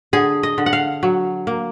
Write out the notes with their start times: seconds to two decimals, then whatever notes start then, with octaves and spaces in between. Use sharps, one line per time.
0.13 D3 G#4
0.43 D#5
0.58 D3
0.66 F#5
0.73 F5
1.03 F#3
1.47 A#3